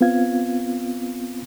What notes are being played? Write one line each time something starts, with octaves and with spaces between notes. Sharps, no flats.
B3 C4 F4 F5 G#6